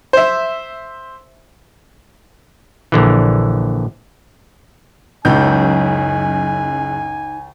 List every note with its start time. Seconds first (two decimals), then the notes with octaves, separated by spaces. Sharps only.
0.13 C5 E5
2.92 A#1 D3 E3
5.25 F#1 C#2 F#2 D#4 G#5 G6